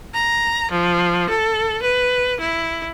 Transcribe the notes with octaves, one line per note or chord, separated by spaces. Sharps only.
A#5
F3
A4
B4
E4